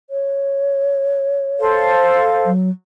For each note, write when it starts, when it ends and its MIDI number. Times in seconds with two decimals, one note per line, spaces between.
0.10 1.95 73
1.59 2.50 69
1.59 2.50 72
1.59 2.50 77
2.46 2.70 54